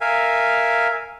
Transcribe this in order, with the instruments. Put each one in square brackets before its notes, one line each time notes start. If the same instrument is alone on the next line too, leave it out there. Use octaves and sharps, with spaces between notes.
[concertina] A#4 E5 F5 G#5